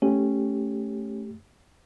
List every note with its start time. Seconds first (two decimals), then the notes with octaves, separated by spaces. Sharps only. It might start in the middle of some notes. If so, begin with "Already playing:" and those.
0.02 A3 C#4 G4